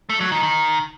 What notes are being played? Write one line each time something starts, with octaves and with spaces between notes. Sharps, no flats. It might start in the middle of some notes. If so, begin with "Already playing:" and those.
A3
F#3
D#3
D#3